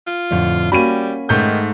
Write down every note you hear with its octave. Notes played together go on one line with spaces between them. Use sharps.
F4
F2 A2 D3
G3 A#3 C#4 F#4 B5 D#7
G#2 D#3 A3 G6